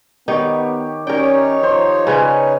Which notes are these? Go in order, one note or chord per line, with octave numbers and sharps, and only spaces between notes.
D#3 B3 D#4 G4 C#5 C#6
C#4 D#4 G4 A#4 C#5 D5 G5
F3 C5 C6
C#3 C#4 B4 G#5